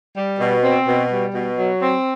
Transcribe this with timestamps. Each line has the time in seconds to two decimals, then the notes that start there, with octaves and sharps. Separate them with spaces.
0.17 G3
0.40 B2
0.64 C4
0.87 B2
1.10 G3
1.34 B2
1.58 F#3
1.82 C4